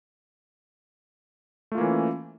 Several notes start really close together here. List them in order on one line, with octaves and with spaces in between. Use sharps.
A3 F4 A#3 E3 C#4